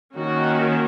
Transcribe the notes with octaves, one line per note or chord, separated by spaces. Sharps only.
D#3 A#3 C#4 F#4